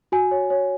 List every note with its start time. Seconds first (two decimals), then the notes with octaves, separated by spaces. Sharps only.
0.12 F#4 G#5
0.31 C#5
0.50 C#5